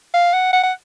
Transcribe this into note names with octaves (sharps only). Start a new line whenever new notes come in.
F5
F#5
F#5
F#5